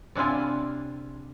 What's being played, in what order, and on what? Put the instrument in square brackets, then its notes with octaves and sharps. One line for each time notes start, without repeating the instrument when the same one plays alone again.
[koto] C3 D4 E4 F4 G#5